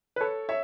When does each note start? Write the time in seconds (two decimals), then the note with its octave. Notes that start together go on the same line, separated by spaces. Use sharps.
0.16 B4
0.21 A4 C#5
0.49 C#5 E5